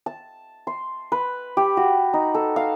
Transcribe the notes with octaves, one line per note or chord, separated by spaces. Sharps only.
A5
C6
B4
G4
F#4
D#4
A4
F5